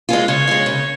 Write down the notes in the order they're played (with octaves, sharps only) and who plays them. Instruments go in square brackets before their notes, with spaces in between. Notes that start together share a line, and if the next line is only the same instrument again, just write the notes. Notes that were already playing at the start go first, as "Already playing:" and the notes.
[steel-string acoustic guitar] G#3 C#4 F4
[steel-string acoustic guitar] C#3 [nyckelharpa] C#5
[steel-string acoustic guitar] G#3 C#4 F4
C#3